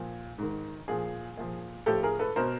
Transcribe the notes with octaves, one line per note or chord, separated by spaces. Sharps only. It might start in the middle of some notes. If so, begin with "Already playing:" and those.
Already playing: A#2 F3
G#2 D#3
A#2 F3 G#4
A#2 F3
A2 F3 G4 A4
G#4 A#4
A4 B4
B2 A#4 C5